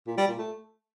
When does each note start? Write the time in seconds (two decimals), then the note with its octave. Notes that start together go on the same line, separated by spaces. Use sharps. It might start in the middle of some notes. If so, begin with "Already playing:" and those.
0.07 A#2
0.17 G3
0.28 A#2
0.38 A3